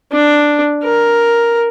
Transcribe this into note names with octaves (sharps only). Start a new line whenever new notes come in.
D4
A#4